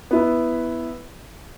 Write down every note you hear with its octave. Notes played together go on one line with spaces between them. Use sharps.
B3 E4 B4